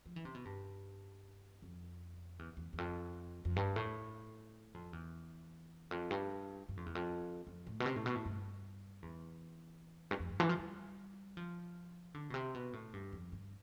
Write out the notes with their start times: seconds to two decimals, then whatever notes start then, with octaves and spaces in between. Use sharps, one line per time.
0.06 F3
0.16 E3
0.25 C3
0.35 B2
0.45 G2
1.62 F2
2.39 E2
2.57 E2
2.73 E2
2.78 F2
3.45 F2
3.56 G2
3.76 A2
4.74 F2
4.93 E2
5.91 F2
6.11 G2
6.69 G2
6.77 F2
6.86 E2
6.95 F2
7.47 F2
7.67 A2
7.80 B2
7.86 C3
7.96 A2
8.06 B2
8.15 A2
8.25 G2
9.02 E2
10.11 G2
10.19 F2
10.29 G2
10.40 E3
10.49 F3
10.59 G3
11.37 F3
12.14 D3
12.30 B2
12.34 C3
12.54 B2
12.73 A2
12.93 G2
13.13 F2
13.32 G2